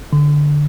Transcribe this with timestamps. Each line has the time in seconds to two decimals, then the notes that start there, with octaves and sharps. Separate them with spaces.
0.13 D3